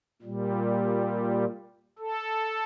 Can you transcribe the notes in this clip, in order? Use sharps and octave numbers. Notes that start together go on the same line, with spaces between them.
A#2 G3
A4